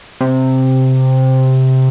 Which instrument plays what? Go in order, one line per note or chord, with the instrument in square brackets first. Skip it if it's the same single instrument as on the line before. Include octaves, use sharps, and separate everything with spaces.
[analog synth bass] C3